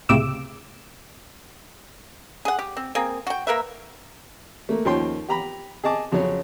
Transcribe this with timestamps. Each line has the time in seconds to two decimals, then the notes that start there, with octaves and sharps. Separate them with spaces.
0.09 C#2 A2 C3 D6 E6
2.45 G#4 F#5
2.59 G4
2.77 C4
2.95 A#3 C4 G#4
3.27 F#4 G5
3.47 A#3 A#4 B4 E5
4.69 A3 A#3
4.85 D#2 F3 C#4 C#5 G5 C6
5.29 G4 A#5 B5
5.84 G#4 D#5 A5 D6
6.12 F2 C#3 F#3 C#4 C#5